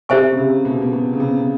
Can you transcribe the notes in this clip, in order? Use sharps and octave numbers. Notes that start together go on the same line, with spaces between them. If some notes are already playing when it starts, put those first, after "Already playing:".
C3 G4 C5 E5 G#5 C#6
C#3
C3
B2
C3
B2
B2
C#3
C3
C3